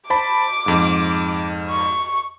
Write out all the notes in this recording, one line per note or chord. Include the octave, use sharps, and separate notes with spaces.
C5 A5 B5 D6
F2 G#2
C#6